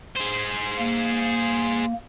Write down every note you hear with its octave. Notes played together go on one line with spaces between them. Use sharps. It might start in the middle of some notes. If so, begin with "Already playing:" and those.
G#4 C5
A#3